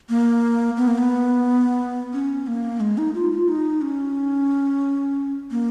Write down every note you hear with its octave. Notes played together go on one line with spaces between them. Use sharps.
A#3
B3
A#3
B3
C#4
A#3
G#3
D#4
F4
F4
D#4
C#4
A#3